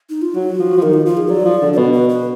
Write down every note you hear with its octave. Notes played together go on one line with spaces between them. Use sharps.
D#4
F4
F#3 F#4
F3
F3
D#3 A#4
F4
F3 F4
G#4
F#3 D5
F3
D3
D5
B2 B4
B4
B4